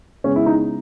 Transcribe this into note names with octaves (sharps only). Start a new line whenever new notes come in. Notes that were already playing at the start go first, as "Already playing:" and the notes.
C#3 G#3 B3 C#4
E4
D#4